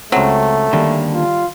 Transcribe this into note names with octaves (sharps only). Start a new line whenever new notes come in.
C#2 F#3 A3 C4
D3 D#3 G3 A#3
F4